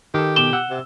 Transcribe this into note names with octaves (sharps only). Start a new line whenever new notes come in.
D#3 G4 A4
B2 D6 E7 G7
F#5 E6
C3